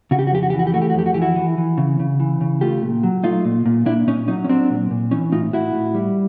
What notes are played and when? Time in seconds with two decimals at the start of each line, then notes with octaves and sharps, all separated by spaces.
0.11 C#3 F#4
0.19 G4
0.27 F#4
0.32 F2 G4
0.43 F#4
0.50 G4
0.53 E3
0.59 F#4
0.67 G4
0.74 A3 F#4
0.82 G4
0.90 F#4
0.94 F2 G4
1.06 F#4
1.14 E3 G4
1.22 E4 F#4
1.36 E3
1.58 E3
1.78 C#3
2.00 C#3
2.20 E3
2.41 C#3
2.61 A3 F4 G4
2.82 A#2
3.03 F#3
3.24 A3 D#4 F4
3.45 A#2
3.66 A#2
3.86 A#2 D4 E4
4.07 A#2 C#4 D#4
4.28 F#3 C#4 D#4
4.44 C#4
4.49 F#3 C4 D4
4.70 A#2
4.91 A#2
5.11 E3 C#4 D#4
5.32 A2 D#4 F4
5.53 A2 E4 F#4
5.74 A2
5.95 G3